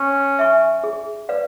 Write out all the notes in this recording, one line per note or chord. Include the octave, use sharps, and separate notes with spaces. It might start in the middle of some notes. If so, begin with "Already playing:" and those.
Already playing: C#4
E5 G#5 C#6
G#4
B4 D5 F5